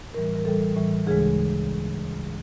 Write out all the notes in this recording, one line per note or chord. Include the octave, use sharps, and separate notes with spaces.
A2 E3 G3 A#4
A#4
A2 E3 G3 A4
A2 E3 G3
D2 C#3 E3 G#3 G#4